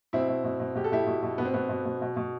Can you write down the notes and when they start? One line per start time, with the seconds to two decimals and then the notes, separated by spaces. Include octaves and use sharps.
0.13 B2 C4 E4
0.29 B2
0.44 B2
0.60 B2
0.75 B2 G4
0.84 A4
0.92 B2 E4 G4
1.07 B2
1.23 B2
1.38 B2 B3
1.45 C4
1.54 B2 B3
1.69 B2
1.85 B2
2.02 B2
2.17 B2